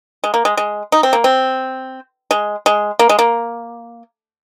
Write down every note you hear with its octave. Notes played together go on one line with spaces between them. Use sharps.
G#3
A#3
G#3
G#3
D#4
C4
A#3
C4
G#3
G#3
A#3
G#3
A#3